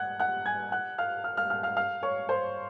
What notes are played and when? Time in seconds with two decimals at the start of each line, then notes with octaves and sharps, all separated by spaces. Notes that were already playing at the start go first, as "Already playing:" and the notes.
Already playing: F#5 F#6 G#6
0.20 F#5 F#6
0.46 G#5 G#6
0.72 F#5 F#6
0.98 F5 F6
1.24 F5 F6
1.37 F5 F6
1.50 F5 F6
1.63 F5 F6
1.77 F5 F6
2.03 C#5 C#6
2.29 C5 C6